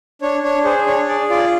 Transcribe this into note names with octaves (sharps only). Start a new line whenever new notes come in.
D4 C#5
D4 C#5
G#4 C5
D4 C#5
G#4 D5
F4 D5